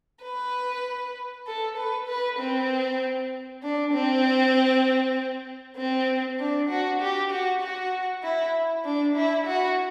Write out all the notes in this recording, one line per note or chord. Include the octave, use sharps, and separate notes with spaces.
B4
A4
B4
B4
C4
D4
C4
C4
D4
F#4
G4
F#4
F#4
E4
D4
E4
F#4